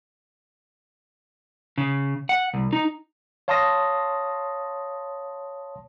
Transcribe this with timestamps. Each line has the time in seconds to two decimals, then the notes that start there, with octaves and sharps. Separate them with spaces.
1.78 C#3
2.29 F#5
2.54 C2
2.73 D#4
3.48 C#5 F5 A5 C6 D#6 A#6